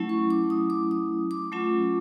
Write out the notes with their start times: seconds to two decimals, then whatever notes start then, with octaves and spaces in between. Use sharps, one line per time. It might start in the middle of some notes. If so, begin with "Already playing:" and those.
Already playing: F#3 A3 C#4 E4
0.09 C#6
0.30 D6
0.50 D#6
0.70 D6
0.91 D#6
1.31 D6
1.52 F#3 A3 C#4 F4